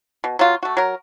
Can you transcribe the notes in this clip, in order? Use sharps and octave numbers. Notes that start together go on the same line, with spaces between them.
B2
F#3 F4
A3 F#4
F#3 A#4